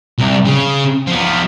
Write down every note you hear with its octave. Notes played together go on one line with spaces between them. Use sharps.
C2
C#3
F3 B3